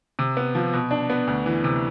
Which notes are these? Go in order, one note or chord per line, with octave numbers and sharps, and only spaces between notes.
C3
B3
F3
B2
D4
B3
D2
E3
C3